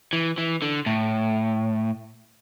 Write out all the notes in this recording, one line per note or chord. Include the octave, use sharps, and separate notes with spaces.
E3
E3
D3
A2